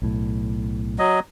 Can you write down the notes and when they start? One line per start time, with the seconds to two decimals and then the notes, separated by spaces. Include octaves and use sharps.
0.02 B1 A2
0.99 F#3 D#5